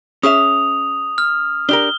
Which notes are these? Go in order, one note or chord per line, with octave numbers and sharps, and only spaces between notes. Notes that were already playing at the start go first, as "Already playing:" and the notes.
C#4 G#4 E5 D#6 F7
F6
D4 G4 A#4 G7